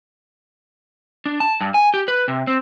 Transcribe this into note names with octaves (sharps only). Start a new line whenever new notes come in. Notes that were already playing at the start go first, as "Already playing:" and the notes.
D4
A5
G2
G#5
G4
B4
C3
C4